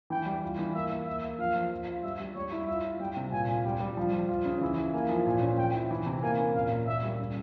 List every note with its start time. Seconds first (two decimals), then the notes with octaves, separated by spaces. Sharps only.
0.10 E3 G5
0.26 G3
0.43 F4
0.59 E3
0.75 A#3 E5
0.91 A#3
1.07 A#3 E5
1.23 A#3
1.39 F3 F5
1.56 F3
1.71 F4
1.88 F4
2.03 G3 E5
2.19 G3
2.35 G3 C#5
2.52 E4
2.68 F4 E5
2.85 F4
3.00 G3 G5
3.17 C3
3.32 A#2 G#5
3.48 F4
3.65 G3 G5
3.80 G3
3.97 F3 F5
4.13 F3
4.29 F4
4.45 C#3
4.61 E3 E5
4.77 E4
4.93 A#3 G#5
5.09 F3
5.26 A#2 G#5
5.42 C#4
5.58 F3 G5
5.74 E4
5.91 E3
6.06 C3
6.22 A#3 G#5
6.39 C#4
6.55 A#2 F5
6.71 A#2
6.87 A#3 E5
7.03 G3
7.19 C#3